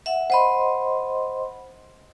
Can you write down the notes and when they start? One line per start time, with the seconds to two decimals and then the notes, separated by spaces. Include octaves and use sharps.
0.06 E5 F#5
0.30 C5 D#5 F#5 B5 C6